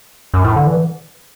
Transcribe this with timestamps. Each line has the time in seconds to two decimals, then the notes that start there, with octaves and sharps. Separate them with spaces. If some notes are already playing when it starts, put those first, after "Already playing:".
0.34 F#2
0.44 A2
0.56 D3
0.67 E3